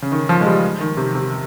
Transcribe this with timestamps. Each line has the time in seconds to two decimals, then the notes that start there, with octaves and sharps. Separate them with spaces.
0.02 C#3
0.12 D#3
0.29 F3
0.41 G#3
0.46 G3
0.80 D#3
0.97 C3
1.15 C3